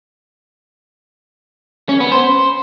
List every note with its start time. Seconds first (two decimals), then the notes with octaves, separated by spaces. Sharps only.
1.89 C#4
2.00 B3
2.12 C5